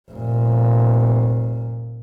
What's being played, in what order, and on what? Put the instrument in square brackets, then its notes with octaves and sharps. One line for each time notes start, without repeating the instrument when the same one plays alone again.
[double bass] F1 A#2